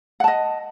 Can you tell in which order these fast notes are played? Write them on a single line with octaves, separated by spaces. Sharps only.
F#5 A5 D#5